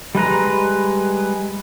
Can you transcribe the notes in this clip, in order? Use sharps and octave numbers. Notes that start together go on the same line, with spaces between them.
G3 G#3 B4 A#5